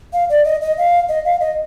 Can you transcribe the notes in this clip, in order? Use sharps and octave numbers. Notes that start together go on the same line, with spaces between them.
F5
D5
D#5
D#5
F5
D#5
F5
D#5